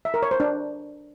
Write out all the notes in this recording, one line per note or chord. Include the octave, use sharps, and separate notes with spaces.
E5
A#4
C#5
C5
D4